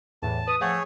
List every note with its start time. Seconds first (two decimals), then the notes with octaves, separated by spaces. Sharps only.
0.22 E2 A2 E3 A5
0.48 B4 D#6
0.61 F3 A3 G#4 C#5 F5 F#5 C#6